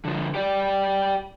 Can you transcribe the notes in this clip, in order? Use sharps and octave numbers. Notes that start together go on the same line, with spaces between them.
D3 F3
G4 D5